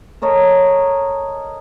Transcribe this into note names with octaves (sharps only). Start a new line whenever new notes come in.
A4 A#4 C#5 D#5